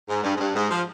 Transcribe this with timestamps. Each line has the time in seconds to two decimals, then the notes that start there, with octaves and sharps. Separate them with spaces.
0.09 G#2
0.24 G2
0.35 G#2
0.40 G2
0.55 G#2
0.71 F3